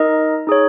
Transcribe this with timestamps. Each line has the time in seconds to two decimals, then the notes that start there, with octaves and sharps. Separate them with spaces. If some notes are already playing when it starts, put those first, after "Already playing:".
Already playing: D#4 A#4 D#5
0.47 D#4 G#4 C#5